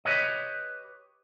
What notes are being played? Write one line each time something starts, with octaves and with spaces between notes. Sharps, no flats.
G4 B4 C#5 D#5